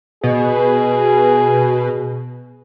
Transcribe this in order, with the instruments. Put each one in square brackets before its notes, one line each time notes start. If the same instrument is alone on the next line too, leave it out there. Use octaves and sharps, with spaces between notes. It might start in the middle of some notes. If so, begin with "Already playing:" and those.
[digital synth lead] B2 [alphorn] G#4